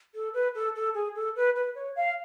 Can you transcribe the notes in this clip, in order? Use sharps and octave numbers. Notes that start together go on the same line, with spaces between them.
A4
B4
A4
A4
G#4
A4
B4
B4
C#5
F5